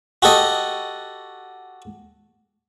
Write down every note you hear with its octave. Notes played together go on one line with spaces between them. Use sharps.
F#4 G4 A4 D#5